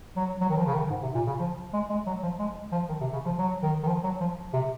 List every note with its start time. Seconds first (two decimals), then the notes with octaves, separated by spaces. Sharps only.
0.16 F#3
0.41 F#3
0.49 D#3
0.57 F3
0.66 C#3
0.74 D#3
0.90 G#2
1.02 C3
1.14 A#2
1.27 C#3
1.40 F3
1.73 G#3
1.90 G#3
2.06 F#3
2.23 F3
2.39 G#3
2.72 F3
2.89 D#3
3.01 C3
3.13 C#3
3.25 F3
3.38 F#3
3.63 D#3
3.83 D#3
3.87 F3
4.03 F#3
4.20 F3
4.53 C3